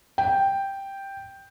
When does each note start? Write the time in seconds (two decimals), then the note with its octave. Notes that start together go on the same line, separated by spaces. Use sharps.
0.18 G5